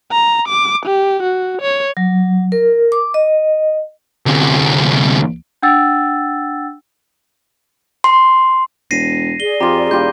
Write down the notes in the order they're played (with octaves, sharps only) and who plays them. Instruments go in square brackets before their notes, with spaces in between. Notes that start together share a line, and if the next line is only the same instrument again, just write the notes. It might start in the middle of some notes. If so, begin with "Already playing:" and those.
[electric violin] A#5
D6
G4
F#4
C#5
[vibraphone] F#3
A#4
D6
D#5
[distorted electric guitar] D2 C3
[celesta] D4 F#5 G5 E6 A6
[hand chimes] C6
[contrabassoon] E1 [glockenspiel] A#6 C7 D#7
[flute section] G#4 D5 [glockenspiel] G7
[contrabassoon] F2 [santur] F4 G4 [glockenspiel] A#5
[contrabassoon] E1 [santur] E4 F4 G4 [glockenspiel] G6